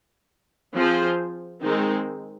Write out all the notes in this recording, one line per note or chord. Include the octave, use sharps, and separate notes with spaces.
F3 C4 F4 G#4 C5
D#3 G#3 C4 D#4